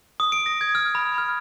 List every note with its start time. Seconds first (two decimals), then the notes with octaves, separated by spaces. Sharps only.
0.20 D#6
0.32 D7
0.46 A#6
0.61 G#6
0.75 F6
0.95 B5
1.18 F6